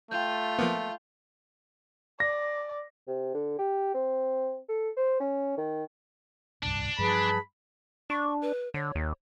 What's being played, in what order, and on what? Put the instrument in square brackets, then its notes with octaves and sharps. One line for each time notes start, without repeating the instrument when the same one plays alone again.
[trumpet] A3 [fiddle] F4 [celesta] G5 G6
[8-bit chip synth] F3 A#3 B3
[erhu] D5 [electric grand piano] A#6
[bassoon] C3
D3
G4
C4
A4
C5
C#4
D#3
[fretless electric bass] D1 C2 G2 [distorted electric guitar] D4
[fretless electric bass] G2 F3 F#3 [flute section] G#4 B4 A5 [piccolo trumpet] B5
[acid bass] D4 [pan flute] C#6
[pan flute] B4
[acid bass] D3 [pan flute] C#5
[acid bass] D#2